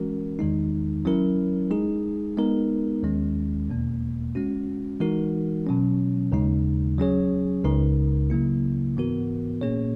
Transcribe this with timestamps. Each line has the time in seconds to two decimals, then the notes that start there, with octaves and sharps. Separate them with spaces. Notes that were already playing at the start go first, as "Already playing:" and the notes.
Already playing: E3 G#3 C#4 F#4 A#4
0.39 E2 D#3 G#3 D#4
1.05 F#3 C#4 E4 A#4
1.71 G#3 D#4 G#4
2.37 G#3 B3 D#4 A#4
3.03 D#2 D#3 G#3 C#4
3.69 E2 B2 A#3
4.35 G#3 C#4 F#4
5.00 E3 G#3 D#4 F#4 A#4
5.67 B2 F#3 C#4
6.32 D#2 C#3 G#3 D#4
6.98 F#3 C#4 G#4 C#5
7.64 C#2 C#3 G#3 D#4 A#4
8.30 C#3 F#3 A#3 E4
8.96 G#2 E3 B3 F#4 A#4
9.61 A#2 A#3 C#4 G#4 C#5